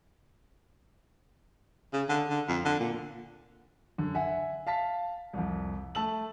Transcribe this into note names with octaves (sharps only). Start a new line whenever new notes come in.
C#3
D3
D3
F2
D3
A#2
F#2 D3
E5 F#5 G#5
F5 A5 B6
C2 F2
A3 A5 E6 F#7